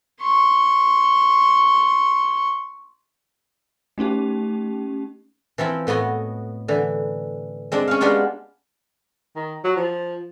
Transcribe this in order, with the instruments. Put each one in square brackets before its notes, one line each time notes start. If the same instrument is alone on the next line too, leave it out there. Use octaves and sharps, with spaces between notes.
[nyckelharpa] C6 C#6
[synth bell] A3 C#4 D#4 G4
[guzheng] E3 F3 C4 E4
A2 B3 F#4 D#5 G#5
D3 E3
G#3 C4 D4
C#4 F5
G3 G#3 B3 D4 F4
[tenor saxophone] D#3
F#3
F3